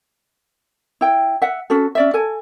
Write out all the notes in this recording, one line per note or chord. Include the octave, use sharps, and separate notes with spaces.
E4 G5
E5 F#5
C#4 F#4 A4
C#4 D5 E5
A4 G#5